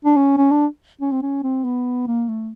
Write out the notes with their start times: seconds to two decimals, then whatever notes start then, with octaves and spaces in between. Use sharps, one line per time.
0.05 D4
0.16 C#4
0.37 C#4
0.51 D4
1.01 C#4
1.11 C4
1.22 C#4
1.43 C4
1.64 B3
2.07 A#3
2.29 A3